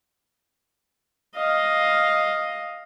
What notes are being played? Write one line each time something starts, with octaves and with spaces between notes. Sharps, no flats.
D#5 F5